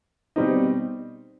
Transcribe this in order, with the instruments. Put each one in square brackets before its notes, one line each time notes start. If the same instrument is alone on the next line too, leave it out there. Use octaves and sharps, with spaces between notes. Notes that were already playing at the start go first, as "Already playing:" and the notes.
[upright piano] B2 G3 C4 D#4